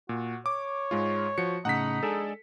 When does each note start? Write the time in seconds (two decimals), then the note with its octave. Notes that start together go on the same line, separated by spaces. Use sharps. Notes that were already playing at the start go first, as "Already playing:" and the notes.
0.09 A#2 F#4
0.46 C#5 D6
0.91 G#2 G#3 F4
1.38 F3 F#4 C#7
1.65 A2 C#3 D#4 F#5 B6
2.03 G#3 D4 G#4 A4